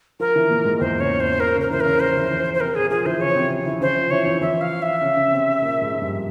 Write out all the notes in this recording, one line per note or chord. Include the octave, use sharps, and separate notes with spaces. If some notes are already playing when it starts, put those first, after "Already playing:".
F3 F4 A#4
E3 E4
A#2 A#3
G#2 G#3
E2 E3 C5
C#3 C#5
E2 E3 C5
A#2 A#3 A#4
C#3 C#4
A#4
E3 E4 C5
C#3 C#4 A#4
F3 F4 C5
E3 E4
E3 E4
C5
C3 C4 A#4
A#2 A#3 G#4
F3 F4 G#4
E3 E4 C5
C#3 C#4 C#5
C3 C4
E3 E4
C#3 C#4 C5
F3 F4
E3 E4 C#5
E3 E4
E3 E4 E5
F5
E5
C#3 C#4
C#3 C#4
C3 C4
A#2 A#3
G#2 G#3
F3
G2 G3